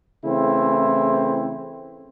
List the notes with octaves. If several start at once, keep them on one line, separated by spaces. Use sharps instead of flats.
C#3 E3 A3 C4 E4